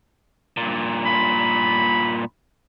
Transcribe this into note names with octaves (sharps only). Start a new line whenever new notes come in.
G2 A#2
B5